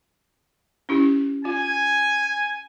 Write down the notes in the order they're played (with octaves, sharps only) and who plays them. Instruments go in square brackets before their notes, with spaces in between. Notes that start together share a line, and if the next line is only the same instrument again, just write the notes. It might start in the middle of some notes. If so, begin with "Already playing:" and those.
[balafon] C#4 E4 G4
[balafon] F4 [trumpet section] G#5